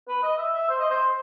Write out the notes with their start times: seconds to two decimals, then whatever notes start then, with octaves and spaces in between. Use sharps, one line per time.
0.08 B4
0.23 D#5
0.39 E5
0.54 E5
0.69 C5
0.80 D#5
0.90 C5